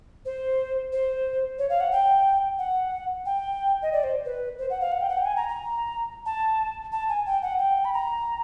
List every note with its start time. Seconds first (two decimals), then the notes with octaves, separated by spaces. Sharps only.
0.25 C5
0.92 C5
1.59 C#5
1.70 F5
1.80 F#5
1.92 G5
2.59 F#5
3.26 G5
3.82 D#5
3.92 D5
4.04 C5
4.25 B4
4.59 C5
4.70 F#5
4.81 F5
4.92 F#5
5.01 G5
5.09 F#5
5.17 G5
5.25 G#5
5.37 A#5
5.49 A#5
6.26 A5
6.92 A5
7.09 G#5
7.26 G5
7.42 F#5
7.59 G5
7.85 B5
7.93 A#5